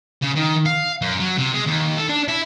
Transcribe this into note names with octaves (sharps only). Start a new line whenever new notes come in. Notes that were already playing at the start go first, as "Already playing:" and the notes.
C#3
D#3
F5
F#2
F#3
C3
G#3
D#2
A4
D4
E4